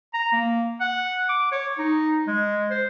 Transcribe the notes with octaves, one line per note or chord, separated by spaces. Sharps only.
A#5
A#3
F#5
D6
C#5
D#4
G#3
C5